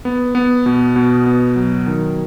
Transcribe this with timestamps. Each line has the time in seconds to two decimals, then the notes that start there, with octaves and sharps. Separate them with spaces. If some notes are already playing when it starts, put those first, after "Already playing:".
0.05 B3
0.35 B3
0.66 B2
0.96 B2
1.26 B3
1.56 F#3
1.87 D#3